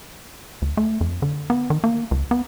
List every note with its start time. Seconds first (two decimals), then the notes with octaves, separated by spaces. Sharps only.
0.62 D2
0.77 A3
1.01 F2
1.22 D3
1.50 B3
1.70 D#3
1.84 A#3
2.11 C#2
2.31 B3